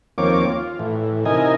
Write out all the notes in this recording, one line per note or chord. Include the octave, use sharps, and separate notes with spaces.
D#2 F3 A#3 C4 C#5 D6
F4
A2 E3
C3 D#4 E4 A#4 D#5 G#5